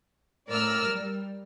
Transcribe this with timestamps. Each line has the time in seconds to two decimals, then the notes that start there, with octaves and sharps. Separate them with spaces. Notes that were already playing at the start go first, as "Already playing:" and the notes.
0.49 A2 A#4 D5 E6 F6
0.86 G3